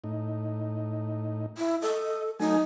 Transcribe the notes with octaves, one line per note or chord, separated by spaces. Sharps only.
A2 D#4
E4
A4 D#5
F#3 A3 D#4 G#5